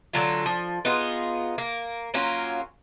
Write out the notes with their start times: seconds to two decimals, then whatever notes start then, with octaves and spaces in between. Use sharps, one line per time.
0.13 D3 F#3 F4
0.46 F3
0.85 B3 D#4 F4 G#4
1.58 A#3
2.14 F#3 A#3 C#4 F4